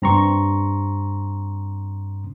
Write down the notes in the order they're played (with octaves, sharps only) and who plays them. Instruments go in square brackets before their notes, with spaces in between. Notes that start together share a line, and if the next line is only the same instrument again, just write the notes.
[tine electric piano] G2 C4 A#5 C6 C#6